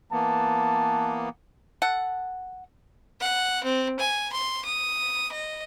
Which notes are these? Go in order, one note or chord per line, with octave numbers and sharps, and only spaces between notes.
E3 A#3 B3 A5
A4 F#5
F#5
C4
G#5
C6
D#6
D#5